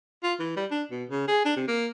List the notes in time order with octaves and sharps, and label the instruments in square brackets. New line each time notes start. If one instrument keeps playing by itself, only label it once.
[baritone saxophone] F4
E3
G3
D4
B2
C#3
G#4
D4
C3
A#3